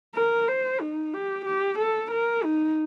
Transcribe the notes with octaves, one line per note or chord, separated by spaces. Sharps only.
A#4
C5
D#4
G4
G4
A4
A#4
D#4